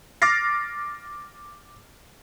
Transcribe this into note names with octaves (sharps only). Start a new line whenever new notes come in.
D6 F6 A6 A#6 C7